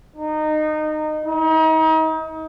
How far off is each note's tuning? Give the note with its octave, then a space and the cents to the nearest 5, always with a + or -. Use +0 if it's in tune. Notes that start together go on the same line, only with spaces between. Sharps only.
D#4 -20
D#4 +35